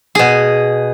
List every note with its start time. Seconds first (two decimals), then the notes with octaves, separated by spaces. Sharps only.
0.15 B2 G#4